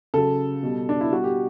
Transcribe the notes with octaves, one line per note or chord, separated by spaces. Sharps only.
C#3 F#3 A4
B2 G3
D4
E4
B2 G3 F#4
G4